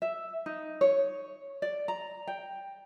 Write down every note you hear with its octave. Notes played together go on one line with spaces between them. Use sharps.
E5
D#4
C#5
D5
A#5
G5